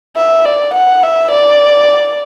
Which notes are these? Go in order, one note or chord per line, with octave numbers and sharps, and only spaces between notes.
E5
D5
F#5
E5
D5